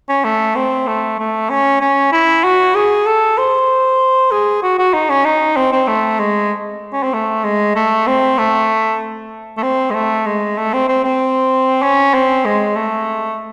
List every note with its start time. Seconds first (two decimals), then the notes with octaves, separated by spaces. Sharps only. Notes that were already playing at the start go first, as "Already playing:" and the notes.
0.09 C#4
0.25 A3
0.56 C4
0.87 A3
1.19 A3
1.50 C#4
1.81 C#4
2.12 E4
2.44 F#4
2.75 G#4
3.06 A4
3.38 C5
4.31 G#4
4.63 F#4
4.79 F#4
4.94 D#4
5.10 C#4
5.25 D#4
5.57 C4
5.72 C4
5.88 A3
6.19 G#3
6.93 C#4
7.03 C4
7.13 A3
7.44 G#3
7.76 A3
8.07 C4
8.38 A3
9.57 A3
9.63 C4
9.90 G#3
9.94 A3
10.26 G#3
10.57 A3
10.73 C4
10.88 C4
11.04 C4
11.82 C#4
12.14 C4
12.45 G#3
12.76 A3